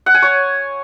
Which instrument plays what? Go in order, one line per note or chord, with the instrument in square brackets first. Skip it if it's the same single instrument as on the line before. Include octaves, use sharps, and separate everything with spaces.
[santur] F#5
G#5
C#5